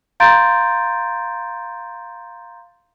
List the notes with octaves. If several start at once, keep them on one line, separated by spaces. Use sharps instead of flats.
F5 A#5 C6 G6 A6 D7